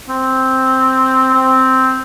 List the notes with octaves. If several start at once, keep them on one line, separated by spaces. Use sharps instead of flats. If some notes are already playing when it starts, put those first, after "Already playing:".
C4
C4